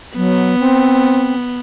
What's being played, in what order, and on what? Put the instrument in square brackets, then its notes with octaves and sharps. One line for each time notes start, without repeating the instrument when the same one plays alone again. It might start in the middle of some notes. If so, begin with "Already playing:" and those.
[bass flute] F#3 [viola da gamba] B3
[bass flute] C4